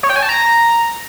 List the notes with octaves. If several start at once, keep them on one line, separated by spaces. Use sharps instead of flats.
C#5
G5
G#5
A5
A#5